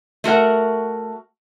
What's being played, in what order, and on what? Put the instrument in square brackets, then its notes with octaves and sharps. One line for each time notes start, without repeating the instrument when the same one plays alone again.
[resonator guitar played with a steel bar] A3 F#4 A#4 F#5